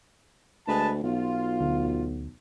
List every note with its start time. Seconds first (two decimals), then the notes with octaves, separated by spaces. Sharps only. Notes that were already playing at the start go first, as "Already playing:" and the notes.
0.68 D2 G#3 B4 A5
1.03 B1 F4
1.61 D2